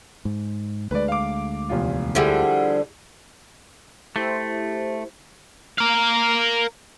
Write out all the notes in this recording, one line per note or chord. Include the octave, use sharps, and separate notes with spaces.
G#2
D2 G#3 B4 D5
F5 D6
F1 E2 F4
D3 F3 G3 E4 G4 G#4
A3 E4 G4 C5
A#4 F5